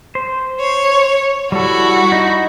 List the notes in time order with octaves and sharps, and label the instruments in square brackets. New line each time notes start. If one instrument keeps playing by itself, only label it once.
[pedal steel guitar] C5
[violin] C#5
[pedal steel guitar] G3 A4 [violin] E4 F#4
[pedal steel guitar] D#4 D#5